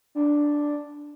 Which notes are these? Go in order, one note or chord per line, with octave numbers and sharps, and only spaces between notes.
D4